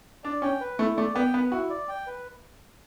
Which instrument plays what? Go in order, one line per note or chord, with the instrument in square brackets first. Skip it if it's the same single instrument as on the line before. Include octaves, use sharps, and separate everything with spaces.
[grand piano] D4 [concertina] D5
[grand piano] C#4 [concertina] G5
[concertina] B4
[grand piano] A3 [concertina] E4
[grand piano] A3 [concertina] D5
[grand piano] B3 [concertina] G5
[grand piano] B3 [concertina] B4
[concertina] E4 [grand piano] F#4
[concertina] D5
G5
B4